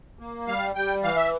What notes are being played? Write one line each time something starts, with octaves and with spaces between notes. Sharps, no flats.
A#3
G3 F5
G3 G5
E3 F5
E5